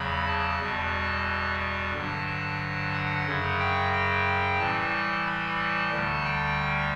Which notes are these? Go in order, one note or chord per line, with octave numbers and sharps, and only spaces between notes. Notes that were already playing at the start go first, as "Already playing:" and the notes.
Already playing: E2 C#3 F#3 B5
A5
E2 B2 G3
A5
G2 D3 F#3
A5
F#5
F#2 C#3 F#3
G5
G5
A2 E3 G3 A5
B5
A5
D2 D3 G3
G5